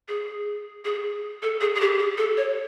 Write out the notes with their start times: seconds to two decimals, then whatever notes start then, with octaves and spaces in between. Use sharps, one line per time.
0.08 G#4
0.85 G#4
1.42 A4
1.61 G#4
1.75 G#4
1.81 G4
1.99 G#4
2.18 A4
2.37 C#5